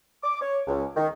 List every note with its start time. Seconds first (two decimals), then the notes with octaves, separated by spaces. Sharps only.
0.24 D6
0.41 C#5
0.67 C#2
0.96 D#3